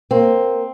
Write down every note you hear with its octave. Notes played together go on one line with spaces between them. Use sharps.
A#3 C4